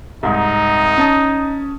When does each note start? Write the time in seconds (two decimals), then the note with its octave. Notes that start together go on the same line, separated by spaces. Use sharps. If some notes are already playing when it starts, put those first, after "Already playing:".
0.23 C2 G#2 D#4
0.98 C#4 A5 D#6